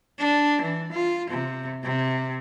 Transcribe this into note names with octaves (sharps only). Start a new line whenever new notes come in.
D4
E3
F4
C3
C3